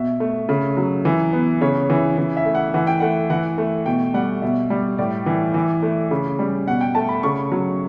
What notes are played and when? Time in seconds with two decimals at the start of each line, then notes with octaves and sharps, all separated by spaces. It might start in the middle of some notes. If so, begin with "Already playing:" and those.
Already playing: B2 E5
0.20 A3
0.49 C#3
0.77 F#3
1.05 E3
1.33 B3
1.61 C#3 C#5
1.90 E3
2.18 E3
2.37 E5
2.45 A3
2.55 F#5
2.74 E3 F#5
2.87 G5
3.00 A3 F#5
3.30 E3 F#5
3.58 A3
3.86 B2 G5
4.14 G3 F#5
4.42 B2 E5
4.70 G3
4.98 A2 D5
5.26 E3
5.54 E3
5.82 A3
6.11 C#3
6.39 G3
6.67 B2 F#5
6.81 G5
6.95 A3 A5
7.09 B5
7.23 C#3 C#6
7.52 F#3